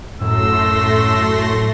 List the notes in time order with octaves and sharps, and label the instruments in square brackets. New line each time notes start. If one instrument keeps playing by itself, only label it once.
[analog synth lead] F#2 [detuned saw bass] A2 [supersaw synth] A3 C6 A#6 [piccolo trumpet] E6